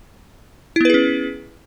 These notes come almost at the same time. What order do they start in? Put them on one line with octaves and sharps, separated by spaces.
E4 B3 B4 G#4 C#4